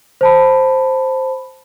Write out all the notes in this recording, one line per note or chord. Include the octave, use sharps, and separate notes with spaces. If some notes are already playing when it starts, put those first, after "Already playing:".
C5 A5 B5